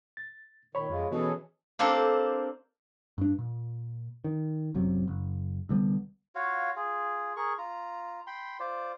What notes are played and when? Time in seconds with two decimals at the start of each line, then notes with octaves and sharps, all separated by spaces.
0.17 A6
0.75 A#2 D#3 C#5 B5
0.89 F2 G#3 F4
1.11 B2 E3 C#4 G#4 A4
1.79 A#3 C4 D4 G4 A4 C5
3.18 G2 D4
3.39 A#2
4.24 D#3
4.75 F#1 C#2 C3 F#3
5.08 F#1
5.69 C2 D3 G3 B3
6.35 F4 F#4 C#5 F5
6.76 F4 G#4
7.37 G#4 A#4 C#6
7.58 F4 A#5
8.27 G5 B5 C6
8.60 F4 C5 D5